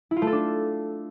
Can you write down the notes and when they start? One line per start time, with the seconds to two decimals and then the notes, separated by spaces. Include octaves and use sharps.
0.11 E4
0.16 F4
0.22 A3
0.27 A4
0.33 D4